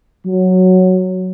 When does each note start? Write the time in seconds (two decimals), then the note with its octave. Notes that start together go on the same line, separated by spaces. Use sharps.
0.26 F#3